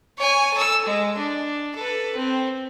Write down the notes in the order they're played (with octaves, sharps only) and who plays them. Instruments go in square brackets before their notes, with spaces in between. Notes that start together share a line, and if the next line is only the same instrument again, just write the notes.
[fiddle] C#5 G#5
A4 E6
G#3
D4
A4 B4
C4